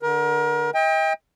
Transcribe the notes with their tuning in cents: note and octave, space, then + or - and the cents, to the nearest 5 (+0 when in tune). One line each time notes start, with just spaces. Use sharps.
D3 +0 A#4 +30
D#5 +40 G5 +30